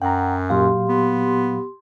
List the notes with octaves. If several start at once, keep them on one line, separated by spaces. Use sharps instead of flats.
F#2 F#5 G5 A#5
A#2 F#3 G4 F5 C6
B3